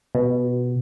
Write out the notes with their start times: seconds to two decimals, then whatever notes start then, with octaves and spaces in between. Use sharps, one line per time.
0.15 B2